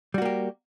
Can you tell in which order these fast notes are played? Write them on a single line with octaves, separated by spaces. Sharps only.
G3 F#4 A#3 G4